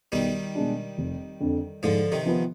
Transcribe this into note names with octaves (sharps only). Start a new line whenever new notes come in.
B1 D#3 G3
B2 G#3 D4
F1
F2 D3
G#2 D3 F3
C3 D#3
F3 B3